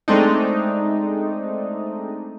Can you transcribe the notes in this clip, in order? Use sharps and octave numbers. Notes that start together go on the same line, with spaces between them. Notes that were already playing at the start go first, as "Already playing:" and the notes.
G#3 A3 C4 D4 D#4